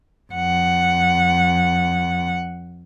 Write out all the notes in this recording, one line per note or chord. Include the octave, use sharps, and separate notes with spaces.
F2 F#5